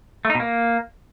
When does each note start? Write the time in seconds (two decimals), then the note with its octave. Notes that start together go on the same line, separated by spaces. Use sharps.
0.25 A3
0.30 D#4
0.35 B2
0.40 A#3